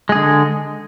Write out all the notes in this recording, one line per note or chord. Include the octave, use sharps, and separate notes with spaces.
D3 G#3 G#4